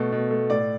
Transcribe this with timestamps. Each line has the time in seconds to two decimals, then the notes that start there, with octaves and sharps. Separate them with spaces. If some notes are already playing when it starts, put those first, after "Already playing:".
Already playing: B2 A3
0.12 B2
0.31 A3
0.50 A2 D5